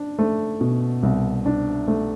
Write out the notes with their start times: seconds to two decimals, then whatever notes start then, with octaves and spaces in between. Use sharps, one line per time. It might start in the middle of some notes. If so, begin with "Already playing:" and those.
Already playing: D4
0.19 A3
0.61 B2
1.03 C2
1.46 D4
1.88 A3